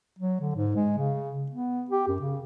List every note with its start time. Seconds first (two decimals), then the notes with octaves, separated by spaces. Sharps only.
0.19 F#3
0.41 D3
0.56 G#2
0.76 G#3
0.98 C#3
1.52 B3
1.90 G4
2.08 F#2
2.20 C#3